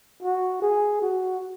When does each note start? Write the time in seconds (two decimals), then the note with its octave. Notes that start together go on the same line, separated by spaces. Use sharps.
0.23 F#4
0.62 G#4
1.02 F#4